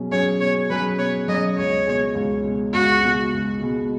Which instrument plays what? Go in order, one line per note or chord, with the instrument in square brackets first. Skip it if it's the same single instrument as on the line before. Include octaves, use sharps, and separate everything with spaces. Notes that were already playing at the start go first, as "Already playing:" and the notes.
Already playing: [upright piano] B2 F#3 C#4 G#4
[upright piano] F#3 C#4 G#4 [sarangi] C#5
[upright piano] B2 [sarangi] C#5
[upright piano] F#3 C#4 G#4 [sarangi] B4
[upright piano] B2 [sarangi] C#5
[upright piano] F#3 C#4 G#4 [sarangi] D#5
[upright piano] C#2 [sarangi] C#5
[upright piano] B2 G#3
C#2
B2 G#3
[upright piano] C#2 [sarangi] F#4
[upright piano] B2 G#3
C#2
B2 G#3